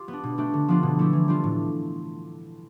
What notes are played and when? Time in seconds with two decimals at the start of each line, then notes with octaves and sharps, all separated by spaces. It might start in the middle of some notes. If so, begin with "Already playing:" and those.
Already playing: F4 G4
0.08 B3
0.13 D4
0.23 B2
0.38 A3 D4 G4
0.54 D3
0.68 F3 B3 D4 F4
0.83 B2
0.99 A3 E4 G4
1.13 E3
1.28 G3 D4 F4
1.44 A2